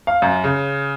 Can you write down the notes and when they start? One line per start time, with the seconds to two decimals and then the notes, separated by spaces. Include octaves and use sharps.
0.07 F5
0.22 F#2
0.44 C#3